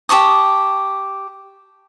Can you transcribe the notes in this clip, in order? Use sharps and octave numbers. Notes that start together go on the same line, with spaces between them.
G4 A5 C#6 D#6